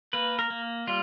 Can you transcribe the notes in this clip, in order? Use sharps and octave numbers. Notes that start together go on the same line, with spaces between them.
A#3 B4
A#4
A#3
G3 F4